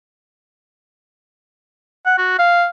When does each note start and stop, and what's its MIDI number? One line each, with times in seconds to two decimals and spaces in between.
2.06 2.14 78
2.18 2.37 66
2.39 2.66 77